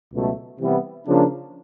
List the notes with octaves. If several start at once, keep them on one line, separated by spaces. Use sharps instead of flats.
C#2 B2 F#3 A3
C3 E3 G3 B3 E4
C#3 F3 A#3 D4